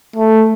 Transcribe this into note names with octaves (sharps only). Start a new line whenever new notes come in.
A3